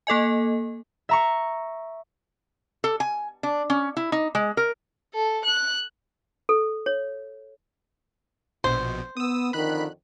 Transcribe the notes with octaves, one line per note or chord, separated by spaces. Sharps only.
A#3 A4 D#5 G#5
E5 A#5 C#6
A4
G#5
D4
C#4
E4
D#4
G#3
A#4
A4
F#6
A4
C#5
A#1 B2 C5
B3 D#6 E6
F2 D3 D#3 B5 F#6